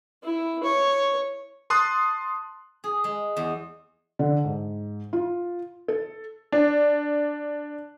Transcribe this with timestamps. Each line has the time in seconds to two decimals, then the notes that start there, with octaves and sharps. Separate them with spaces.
0.24 E4
0.64 C#5
1.70 A5 C6 D#6 F#6
2.84 G#4
3.04 G#3
3.37 E2
4.19 D3
4.45 G#2
5.13 F4
5.88 A4
6.52 D4